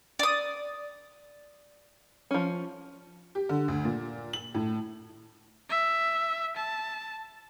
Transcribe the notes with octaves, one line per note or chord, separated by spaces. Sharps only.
D5 D#6
F3 C#4
G4
D3
D2
A#2
F#7
A2
E5
A5